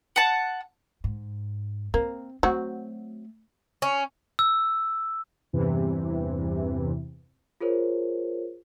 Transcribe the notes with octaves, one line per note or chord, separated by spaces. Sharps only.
F#5 A5
G#2
A#3 C4
F#3 A3 C4 F#4
C#4
E6
E2 G2 C3 E3
F4 G#4 A#4 C5 C#5